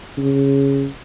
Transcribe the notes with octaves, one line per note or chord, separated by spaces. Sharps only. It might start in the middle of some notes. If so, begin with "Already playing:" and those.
C#3